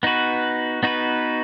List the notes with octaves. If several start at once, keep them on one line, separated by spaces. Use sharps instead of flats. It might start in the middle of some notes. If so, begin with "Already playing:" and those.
B3 D#4 F#4 B4
B3 D#4 F#4 B4